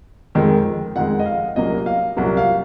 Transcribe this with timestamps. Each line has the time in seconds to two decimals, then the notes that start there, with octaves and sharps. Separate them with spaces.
0.35 F2 D#3 G#3
0.96 F2 D#3 G#3 F#5
1.19 D#5
1.26 F5
1.56 C2 A#2 F#3 A#3 D#5
1.86 F5
2.17 C2 A#2 F#3 A#3 F#5
2.37 F5